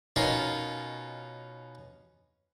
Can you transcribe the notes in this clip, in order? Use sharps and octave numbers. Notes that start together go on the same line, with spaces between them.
B2 C#4 D#4 F4 A#4